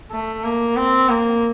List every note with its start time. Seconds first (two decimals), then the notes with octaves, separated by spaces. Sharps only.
0.12 A3
0.44 A#3
0.76 C4
1.09 A#3